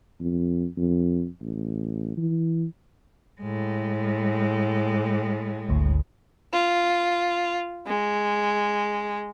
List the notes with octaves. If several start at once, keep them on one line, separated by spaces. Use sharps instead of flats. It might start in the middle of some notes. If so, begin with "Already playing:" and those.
F2
F2
A1
E3
A2 G#3
G#1 D2
F4
G#3